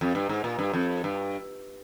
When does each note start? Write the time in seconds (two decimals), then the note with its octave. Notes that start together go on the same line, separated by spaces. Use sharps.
0.01 F2
0.15 G2
0.29 G#2
0.44 A#2
0.59 G2
0.73 F2
1.04 G2